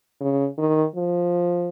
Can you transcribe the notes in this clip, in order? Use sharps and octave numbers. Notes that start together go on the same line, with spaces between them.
C#3
D#3
F3